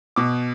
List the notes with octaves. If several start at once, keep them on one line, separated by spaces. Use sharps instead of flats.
B2 D6